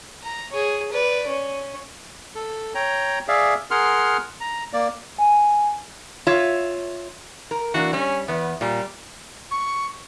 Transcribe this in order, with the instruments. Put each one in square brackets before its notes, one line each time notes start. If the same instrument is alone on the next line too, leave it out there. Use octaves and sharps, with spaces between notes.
[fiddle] A#5
G#4 C#5
B4 D5
C#4
[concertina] A4
C#5 G5 A#5
G#4 D5 E5 F5
G#4 A#4 F#5 C6 F6
A#5
A#3 D5
[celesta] G#5
[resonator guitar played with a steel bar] F4 C#5 E5
A#4
[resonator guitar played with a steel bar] E3 A#3 D4 [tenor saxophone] F#4
[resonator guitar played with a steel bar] G3 [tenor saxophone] C#4
[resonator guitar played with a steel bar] E2 [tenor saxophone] B3
[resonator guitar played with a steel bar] A#2 [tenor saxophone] G3
[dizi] C#6